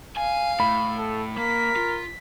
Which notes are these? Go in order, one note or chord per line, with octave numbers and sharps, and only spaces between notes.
F5 G#5
A2 B5
A4
A#3 A#4 B6
F4